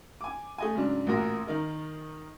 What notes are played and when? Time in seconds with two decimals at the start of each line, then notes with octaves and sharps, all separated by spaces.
0.21 G#5 D6
0.58 A3 D#5 G#5
0.75 G#2 C#3 F#3 D4
1.07 A1 A#2 F#4 A#4 A#6
1.47 D#3 D#4 A#4